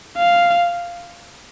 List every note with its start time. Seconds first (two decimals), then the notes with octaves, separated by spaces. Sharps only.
0.17 F5